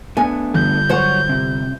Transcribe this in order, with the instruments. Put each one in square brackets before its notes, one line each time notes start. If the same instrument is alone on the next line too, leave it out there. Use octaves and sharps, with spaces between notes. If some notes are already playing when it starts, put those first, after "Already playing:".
[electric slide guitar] A3 B3 D4 [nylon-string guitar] G#5
[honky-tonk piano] G1 [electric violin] G6
[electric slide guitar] F#3 C#5 [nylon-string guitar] C5 F#5
[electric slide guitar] C3